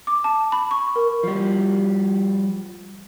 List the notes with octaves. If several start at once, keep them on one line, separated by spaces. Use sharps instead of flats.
D6
A5
B5
C#6
A#4
F3 G3